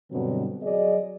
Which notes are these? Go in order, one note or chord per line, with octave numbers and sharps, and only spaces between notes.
G2 B2 D3 F#3 C4
F#3 G#4 D5 D#5